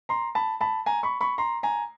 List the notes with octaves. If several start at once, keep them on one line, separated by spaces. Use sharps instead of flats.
A#5 C6
A5 B5
A5 B5
G#5 A#5
B5 C#6
B5 C#6
A#5 C6
G#5 A#5